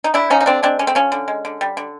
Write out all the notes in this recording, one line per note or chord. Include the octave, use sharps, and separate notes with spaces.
D#4
D3 D4 E4
F3 C#4 D#4
D#4
D3 C4 D4
G#3 C4 D4
D3 C#4
C4
F3 C#4
D3
G#3
D3
G3
D3